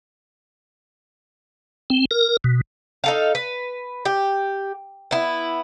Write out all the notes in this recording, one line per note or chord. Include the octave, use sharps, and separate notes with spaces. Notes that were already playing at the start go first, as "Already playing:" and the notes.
C4
A#4
B2
D#4 A4 F5
B4
G4
B3 E4